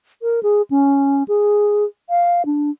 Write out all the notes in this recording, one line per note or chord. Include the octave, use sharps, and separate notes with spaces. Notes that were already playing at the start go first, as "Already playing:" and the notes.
A#4
G#4
C#4
G#4
F5
D4